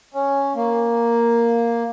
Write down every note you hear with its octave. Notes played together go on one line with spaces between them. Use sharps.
C#4
A#3